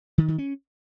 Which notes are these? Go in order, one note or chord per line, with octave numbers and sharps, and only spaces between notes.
D#3
D#3
C#4